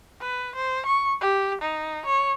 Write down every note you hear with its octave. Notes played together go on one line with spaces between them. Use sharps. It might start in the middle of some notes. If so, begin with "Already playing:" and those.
B4
C5
C#6
G4
D#4
C#5